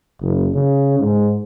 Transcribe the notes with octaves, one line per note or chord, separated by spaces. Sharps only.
F#1
C#3
G#2